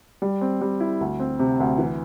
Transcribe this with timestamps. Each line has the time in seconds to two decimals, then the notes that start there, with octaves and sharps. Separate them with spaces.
0.22 G3
0.41 C4
0.61 G3
0.80 E4
1.01 D2
1.20 C4
1.39 C3
1.60 D2
1.78 E3